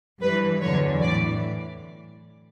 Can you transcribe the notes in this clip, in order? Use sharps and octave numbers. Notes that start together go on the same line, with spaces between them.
G2 E3 B4
E2 D3 F#3 C#5
A2 E3 D5